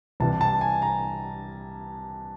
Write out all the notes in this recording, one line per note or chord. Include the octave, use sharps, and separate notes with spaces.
C2 C3 E3 A5
A5
G#5
A#5